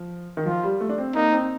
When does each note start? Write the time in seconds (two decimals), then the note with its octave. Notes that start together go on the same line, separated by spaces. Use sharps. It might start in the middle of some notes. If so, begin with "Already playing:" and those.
Already playing: F3
0.37 D#3
0.46 F3 F4
0.63 G3
0.80 A3
0.89 D4
0.98 C4
1.15 A#3 D#4
1.32 C4